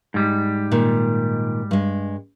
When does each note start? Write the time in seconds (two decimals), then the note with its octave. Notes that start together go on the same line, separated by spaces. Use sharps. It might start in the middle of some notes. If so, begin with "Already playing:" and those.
0.14 G#2 G3
0.71 A#2 D#3
1.71 G2 G#3